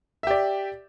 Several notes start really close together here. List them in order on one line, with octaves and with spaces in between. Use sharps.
E5 G4 D5